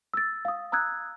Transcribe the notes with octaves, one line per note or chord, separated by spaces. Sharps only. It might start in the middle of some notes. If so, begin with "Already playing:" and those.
E6 A6
F5 D#6
A#5 D#6 E6 F#6 G#6